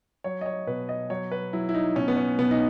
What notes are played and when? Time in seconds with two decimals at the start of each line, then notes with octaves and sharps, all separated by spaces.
0.24 F#3 C#5
0.41 D#5
0.46 C#5
0.67 B2 B4
0.89 D#5
1.10 F#3 C#5
1.31 B4
1.53 F#3 E4
1.69 E4
1.74 D#4
1.96 B2 C#4
2.08 B3
2.17 C#4
2.38 B2 B3
2.51 D#4